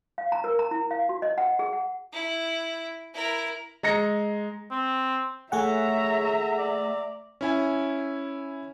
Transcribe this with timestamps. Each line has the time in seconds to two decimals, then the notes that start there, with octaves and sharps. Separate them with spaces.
0.18 F5
0.32 A#5
0.44 A#4
0.59 A#5
0.71 E4
0.91 F5
1.09 F#4
1.22 D#5
1.38 F#5
1.59 G#4
1.73 F#5
2.13 E4
3.14 E4 A#4
3.83 G#3 A#5 A#6 C#7
4.71 C4
5.52 A3 G#4 C#5 E5 F#5 A#5
6.58 D5
7.41 C#4 E4 G#5